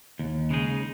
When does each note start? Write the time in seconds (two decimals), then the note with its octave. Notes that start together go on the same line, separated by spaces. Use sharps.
0.19 D#2
0.50 C#3 G#3 D#4 G#4